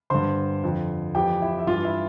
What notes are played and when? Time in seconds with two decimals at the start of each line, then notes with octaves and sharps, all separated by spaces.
0.10 G2 D3 C5 C6
0.63 F2 D3
1.15 F2 E3 G4 G5
1.42 E4 E5
1.59 E5
1.67 G2 E3 F4 F5
1.84 E4 E5